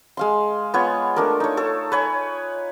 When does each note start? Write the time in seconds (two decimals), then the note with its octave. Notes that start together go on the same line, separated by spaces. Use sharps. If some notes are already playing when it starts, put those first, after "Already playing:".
0.17 G#3 F5 C6
0.74 B3 F4 C#5
1.16 A3 D4 A#4
1.40 D#4 C#5
1.57 A4 C#5
1.92 B4 C#5 G#5